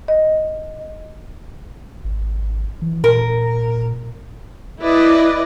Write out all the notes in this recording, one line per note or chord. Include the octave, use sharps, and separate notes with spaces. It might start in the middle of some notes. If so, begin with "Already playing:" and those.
D#5
G#1
E3
A#2 A#4
E4 B4 D5 D#5